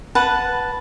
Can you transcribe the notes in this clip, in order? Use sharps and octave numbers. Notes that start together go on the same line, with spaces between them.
B4 F#5 A5